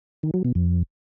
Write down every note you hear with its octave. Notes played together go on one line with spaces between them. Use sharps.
D#3
F#3
B2
F2